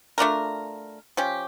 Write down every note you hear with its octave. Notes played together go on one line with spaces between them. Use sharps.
A3 D4 F4 A#4
F3 C#4 G4